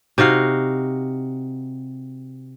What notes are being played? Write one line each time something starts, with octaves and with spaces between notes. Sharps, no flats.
C3 D#4 F#4 F5